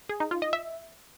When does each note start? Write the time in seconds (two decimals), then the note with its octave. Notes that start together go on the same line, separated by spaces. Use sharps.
0.09 G#4
0.20 D#4
0.31 F4
0.42 D#5
0.53 E5